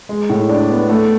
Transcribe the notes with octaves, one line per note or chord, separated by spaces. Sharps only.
G#3
A2
D4
B3
A3